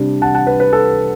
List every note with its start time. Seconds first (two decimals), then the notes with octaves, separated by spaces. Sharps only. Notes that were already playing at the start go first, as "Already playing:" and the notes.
Already playing: C3 G3 D4
0.22 F#5 A5
0.35 F#5 A5
0.47 B4
0.60 B4
0.73 A4